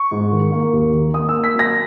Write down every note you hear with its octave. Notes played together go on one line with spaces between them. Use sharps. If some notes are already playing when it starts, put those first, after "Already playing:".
Already playing: C#6
G#2
D#3
A#3
D#2
D#3
A#3 D#6
E6
A#3
B6
F#3 A#6